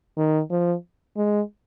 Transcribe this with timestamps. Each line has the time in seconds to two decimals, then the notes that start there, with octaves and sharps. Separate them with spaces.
0.17 D#3
0.51 F3
1.17 G#3